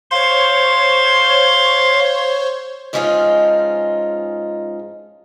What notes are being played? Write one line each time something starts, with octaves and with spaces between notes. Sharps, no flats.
C5 C#5 F5 C6
G#2 F3 G#3 C#4 D#4 F4